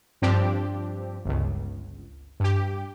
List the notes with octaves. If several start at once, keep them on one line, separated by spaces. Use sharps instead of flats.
G2 F3 C4 D4 G4
G1 C#2
G2 G4